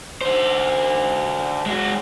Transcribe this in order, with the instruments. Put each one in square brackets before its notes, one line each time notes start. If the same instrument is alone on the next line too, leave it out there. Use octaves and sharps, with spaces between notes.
[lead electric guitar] D3 C5
G#3 F#4